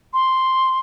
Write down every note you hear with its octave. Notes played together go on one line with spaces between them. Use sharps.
C6